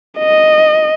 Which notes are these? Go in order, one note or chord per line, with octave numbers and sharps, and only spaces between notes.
D#5